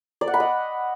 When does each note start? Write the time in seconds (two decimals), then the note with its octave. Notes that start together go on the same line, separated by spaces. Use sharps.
0.21 D5
0.27 F#5
0.34 B5
0.40 D#5